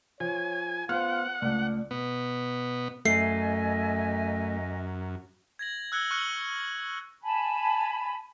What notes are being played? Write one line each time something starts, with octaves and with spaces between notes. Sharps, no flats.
F3 C#5 G#5
B3 F4 B4 C5 F#5 F6
C#2 A3 D5
B2 B3
F#2 A3 D#5 E5 G#5 C7
G#6 A#6 F#7
E6 F#6 G#6 C#7 G7
C#6 F6 F#6 C#7 F#7 G7
G#5 A5 B5